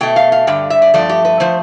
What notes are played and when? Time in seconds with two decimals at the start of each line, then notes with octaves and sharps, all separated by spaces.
0.01 B2 A3 G5
0.16 F5
0.32 F5
0.47 G2 D3 G3 G5
0.70 E5
0.82 D5
0.94 G2 F3 A3 D5
1.09 G4
1.25 B4
1.40 F3 A3 C5